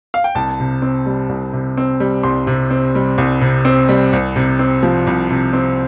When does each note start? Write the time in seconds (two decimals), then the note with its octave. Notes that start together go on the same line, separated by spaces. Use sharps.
0.14 F5
0.24 G5
0.35 C2 A5
0.60 C3
0.82 C4
1.06 G3
1.29 C2
1.53 C3
1.77 C4
2.00 G3
2.23 C2 C6
2.47 C3
2.71 C4
2.95 G3
3.18 C2
3.41 C3
3.65 C4
3.89 G3
4.13 C2
4.36 C3
4.59 C4
4.83 F3
5.07 C2
5.30 C3
5.53 C4